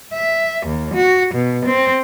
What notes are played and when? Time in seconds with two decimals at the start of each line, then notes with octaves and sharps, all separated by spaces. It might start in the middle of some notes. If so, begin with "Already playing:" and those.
0.15 E5
0.67 D#2
0.96 F#4
1.35 B2
1.68 C4